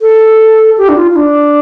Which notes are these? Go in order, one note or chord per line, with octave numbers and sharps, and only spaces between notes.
A4
G4
D4
F4
F4
D4